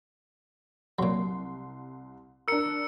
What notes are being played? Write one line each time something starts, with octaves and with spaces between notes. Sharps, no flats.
C2 A#2 F#3 C6
D4 A#4 E6 C#7